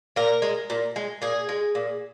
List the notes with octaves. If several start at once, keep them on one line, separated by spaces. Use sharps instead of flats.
A#2 A#4
G#3
A#2
G#3
A#2 G#4
G#3
A#2